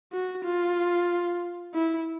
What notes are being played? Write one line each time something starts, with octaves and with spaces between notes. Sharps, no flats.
F#4
F4
E4